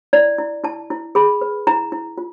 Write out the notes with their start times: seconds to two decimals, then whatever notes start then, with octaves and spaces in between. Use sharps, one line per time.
0.13 E4 D5
0.38 E4
0.64 E4 A5
0.90 E4
1.15 G#4 B5
1.41 B4
1.67 E4 A#5
1.92 E4
2.18 F4